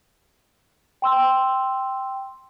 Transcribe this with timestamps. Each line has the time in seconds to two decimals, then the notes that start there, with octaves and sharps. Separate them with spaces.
1.02 G5 C6 E6